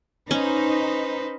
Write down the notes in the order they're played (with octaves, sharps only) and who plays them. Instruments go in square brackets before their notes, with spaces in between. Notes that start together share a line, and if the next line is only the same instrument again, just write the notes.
[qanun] C#4 [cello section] D#4 [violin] B4 C5